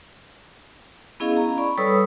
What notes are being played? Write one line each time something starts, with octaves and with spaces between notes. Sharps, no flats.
B3 C#4 E4 G#4 D#5 F5
A#5
D5 B5 C#6
G3 A4 B4 C#5 D#6 E6